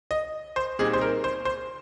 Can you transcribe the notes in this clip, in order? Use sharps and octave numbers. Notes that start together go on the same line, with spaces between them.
D#5
C5
A#2 G3 C4 D#4 G#4
C5
A#4
C5
C5